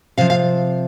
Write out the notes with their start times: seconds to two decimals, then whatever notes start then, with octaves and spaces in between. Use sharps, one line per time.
0.18 C3 F3 F5
0.30 F5